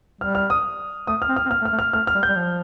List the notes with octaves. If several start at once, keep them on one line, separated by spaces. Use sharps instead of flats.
G3 F6
F6
D#6
A3 D#6
F6
C4
F6
C4
A#3 F6
A3
F6
A3
F6
A3 F6
F6
G3
G6
G3
F3